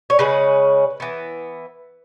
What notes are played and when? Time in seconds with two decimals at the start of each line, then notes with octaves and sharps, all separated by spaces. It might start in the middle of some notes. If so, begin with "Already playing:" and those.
0.10 C#5
0.19 C#3 G#3 C#4 B4
1.00 E3 B3